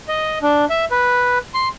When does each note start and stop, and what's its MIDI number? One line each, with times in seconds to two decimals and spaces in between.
0.08 0.38 75
0.42 0.65 62
0.70 0.85 76
0.91 1.38 71
1.54 1.68 84